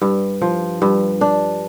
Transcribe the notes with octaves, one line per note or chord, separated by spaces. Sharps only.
G2
F3
G2
D4